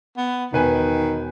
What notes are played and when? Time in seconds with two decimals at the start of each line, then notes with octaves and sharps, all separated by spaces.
0.17 B3
0.53 E1 D#3 B4 G#5